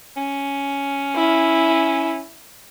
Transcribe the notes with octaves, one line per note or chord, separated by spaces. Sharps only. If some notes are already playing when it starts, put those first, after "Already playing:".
C#4
E4